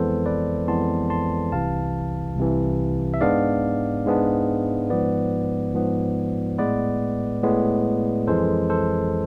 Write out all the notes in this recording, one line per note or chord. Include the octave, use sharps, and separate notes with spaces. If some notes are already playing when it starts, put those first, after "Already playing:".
Already playing: F2 E3 G#3 B3 A4 C5
B4 D5
F2 E3 G#3 B3 A5 C6
A5 C6
C2 C3 E3 F5 A5
C2 C3 E3
E5
G#2 G#3 B3 D4 D5 F5
G#2 G#3 B3 D4
G#2 F3 B3 B4 D5
G#2 F3 B3
A2 G#3 B3 B4 D5
A2 G#3 B3
F2 E3 G#3 A4 C5
A4 C5